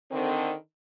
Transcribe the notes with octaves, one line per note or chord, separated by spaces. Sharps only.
D3 D#3 C4